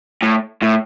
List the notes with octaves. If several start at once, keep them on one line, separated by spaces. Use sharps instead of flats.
A2
A2